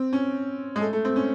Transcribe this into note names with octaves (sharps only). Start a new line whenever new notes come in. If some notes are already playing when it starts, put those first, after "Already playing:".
Already playing: C4
C#4
G#3
A3
A3
C4
C#4